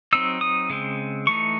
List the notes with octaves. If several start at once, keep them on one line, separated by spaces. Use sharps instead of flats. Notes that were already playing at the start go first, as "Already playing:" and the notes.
F#3 C4 D#4 E6
D#6
C#3 G#3 C4
E3 A3 D#4 C#6